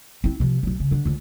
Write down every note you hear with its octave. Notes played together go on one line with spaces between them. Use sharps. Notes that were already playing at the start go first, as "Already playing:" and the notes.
C4 E4
C3 F3
B1 F#3
C#3
D3 D4
C#2 D3